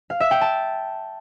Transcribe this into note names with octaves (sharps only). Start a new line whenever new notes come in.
F5
E5
G5
A5